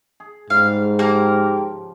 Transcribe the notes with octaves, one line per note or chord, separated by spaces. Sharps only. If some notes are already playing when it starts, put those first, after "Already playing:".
G#4
G#2 C#3 G3 F5
F3 A#3 G4 A#4